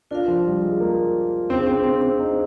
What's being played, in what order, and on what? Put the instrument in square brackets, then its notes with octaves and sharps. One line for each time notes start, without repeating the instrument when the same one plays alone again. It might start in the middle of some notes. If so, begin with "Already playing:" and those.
[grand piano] D4 [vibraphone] F4 A#4 F5
[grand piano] F3
G3
G#3
A#3
[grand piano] C4 [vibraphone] D4 G#4 C5 F5
[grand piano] C4
C4
C4
D#4